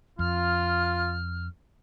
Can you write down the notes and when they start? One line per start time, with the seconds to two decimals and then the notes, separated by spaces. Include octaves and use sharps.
0.19 F2 F4 F6